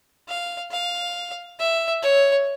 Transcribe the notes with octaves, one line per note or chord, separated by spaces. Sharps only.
F5
F5
E5
C#5